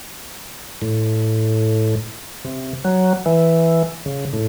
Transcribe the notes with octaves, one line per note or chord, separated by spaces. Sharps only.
A2
C3
F#3
E3
C#3
A2